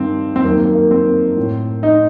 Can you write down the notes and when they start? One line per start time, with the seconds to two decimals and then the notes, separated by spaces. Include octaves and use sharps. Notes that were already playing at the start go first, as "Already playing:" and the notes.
Already playing: G2 D#3 C4
0.36 C4
0.44 F#2 D#3 A#3
0.59 A#3
0.75 A#3
0.91 C4
1.37 A2
1.83 D#4